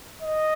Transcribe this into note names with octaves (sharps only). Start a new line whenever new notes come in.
D#5